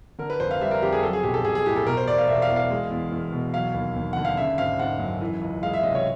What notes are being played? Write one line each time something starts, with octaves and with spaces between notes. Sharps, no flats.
D3 A#4
B4
F1 C5
F5
G3 E5
A#4
F2 G4
G#4
F#3 A4
G#4
B1 G4
A4
B1 G#4
G#4
A2 G4
A4
B2 A#4
C5
E1 D5
F5
E1 E5
F5
E2
F5
G#3
E2
E2
B2
F#3 F5
D#2
D#2
D3 F#5
F5
C#3 E5
G#1 F5
G#1 F#5
F#2
E3
C#2
G#3 F5
E5
C3 D#5
C#5